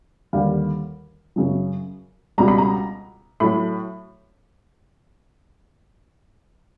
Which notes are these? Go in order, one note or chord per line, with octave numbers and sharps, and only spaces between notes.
D#2 D3 G3 F5
F#2 C#3 F#3
C#2 B2 G3 A#5
B5
A#5
A2 F#3 B5